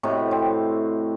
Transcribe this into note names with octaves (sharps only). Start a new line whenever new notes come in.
A2 C3 F#4 D#5
C4